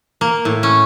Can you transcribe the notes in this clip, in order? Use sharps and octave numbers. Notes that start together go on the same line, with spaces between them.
A#3
A2
C#4